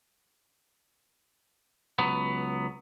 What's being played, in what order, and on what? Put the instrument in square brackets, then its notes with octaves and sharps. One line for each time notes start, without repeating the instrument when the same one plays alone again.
[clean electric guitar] C#2 F#3 B3